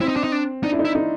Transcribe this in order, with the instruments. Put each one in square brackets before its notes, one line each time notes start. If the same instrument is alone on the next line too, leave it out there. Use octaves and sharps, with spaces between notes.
[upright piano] C4 [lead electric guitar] E4
[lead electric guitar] D#4
D4
D#4
D4
[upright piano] D4 [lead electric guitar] D#4
[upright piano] E4
D#4
[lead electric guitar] E4
[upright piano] D#4